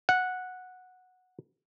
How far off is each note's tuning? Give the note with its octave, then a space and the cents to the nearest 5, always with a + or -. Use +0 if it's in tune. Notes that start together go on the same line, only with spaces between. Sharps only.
F#5 -5